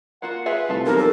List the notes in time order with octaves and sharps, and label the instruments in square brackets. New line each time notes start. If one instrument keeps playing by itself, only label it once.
[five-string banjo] A#3 F4 F#4 [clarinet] F#5
[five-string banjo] F4 G#4 E5 [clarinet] B4
[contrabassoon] C2 [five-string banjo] A3 F4 A4
[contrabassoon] B1 [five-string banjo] E3 F3 C4 [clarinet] G4 [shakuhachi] A#4
[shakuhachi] A4